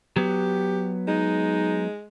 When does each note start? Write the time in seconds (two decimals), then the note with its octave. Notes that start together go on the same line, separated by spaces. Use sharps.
0.16 F#3 B3 G4
1.08 G#3 D#4